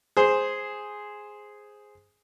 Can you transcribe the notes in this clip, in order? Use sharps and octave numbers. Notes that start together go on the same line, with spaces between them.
G#4 C5